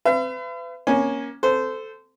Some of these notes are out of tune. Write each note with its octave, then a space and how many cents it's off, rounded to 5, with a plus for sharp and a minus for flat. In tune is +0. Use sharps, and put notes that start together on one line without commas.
B4 +40 E5 +45
A#3 +20 C#4 +0 G#5 +0
A4 +0 C5 -20